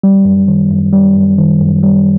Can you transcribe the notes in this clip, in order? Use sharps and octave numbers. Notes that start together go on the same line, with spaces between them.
G3
F#2
D#3
F#2
G3
F#2
D#3
F#2
G3